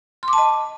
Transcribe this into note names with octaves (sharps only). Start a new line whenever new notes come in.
C6
D6
A5
D#5